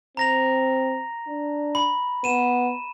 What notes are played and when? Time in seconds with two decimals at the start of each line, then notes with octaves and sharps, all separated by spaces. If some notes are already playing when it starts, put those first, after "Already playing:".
0.17 C4 A#5 A#6 F7
1.28 D4
1.75 B5
2.24 B3 D#7 E7